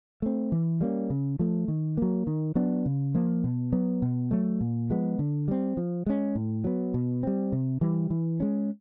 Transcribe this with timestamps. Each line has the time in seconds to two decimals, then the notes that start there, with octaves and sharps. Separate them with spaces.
0.22 A3 C4
0.52 E3
0.81 G3 A#3 C#4
1.10 C#3
1.39 F3 A3
1.68 D#3
1.97 F#3 A#3
2.27 D#3
2.55 F#3 B3 D4
2.86 C#3
3.15 F3 A#3
3.44 B2
3.73 F#3 B3
4.02 B2
4.31 F#3 A3
4.61 A#2
4.90 F3 G#3 B3
5.19 D3
5.48 G3 C4
5.77 F3
6.06 G#3 C#4
6.35 A2
6.64 F#3 B3
6.94 B2
7.23 G3 C4
7.52 C3
7.81 E3 G3
8.10 E3
8.40 G#3 C#4